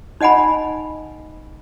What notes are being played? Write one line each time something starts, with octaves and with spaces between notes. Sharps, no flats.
D#4 D#5 F#5 G#5 B5